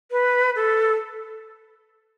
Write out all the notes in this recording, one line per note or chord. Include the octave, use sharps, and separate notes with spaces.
B4
A4